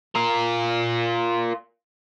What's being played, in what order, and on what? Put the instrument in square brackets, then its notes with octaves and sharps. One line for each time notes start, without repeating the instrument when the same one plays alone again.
[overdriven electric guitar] F4 A#4